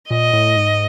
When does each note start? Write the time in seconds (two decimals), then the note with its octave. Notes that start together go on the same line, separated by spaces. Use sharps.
0.10 A#2 D#5
0.33 A2
0.56 G#2